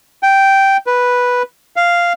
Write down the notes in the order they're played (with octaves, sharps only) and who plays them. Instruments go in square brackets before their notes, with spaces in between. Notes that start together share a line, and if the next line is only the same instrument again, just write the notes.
[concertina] G5
B4
F5